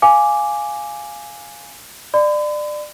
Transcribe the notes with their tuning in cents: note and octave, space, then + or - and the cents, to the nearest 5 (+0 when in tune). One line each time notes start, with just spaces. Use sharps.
F5 +0 G#5 +0 D6 -5
D5 +25 B5 +45